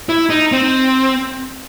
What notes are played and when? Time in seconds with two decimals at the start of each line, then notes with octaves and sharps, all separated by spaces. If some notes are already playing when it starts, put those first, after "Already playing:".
0.09 E4
0.30 D#4
0.52 C4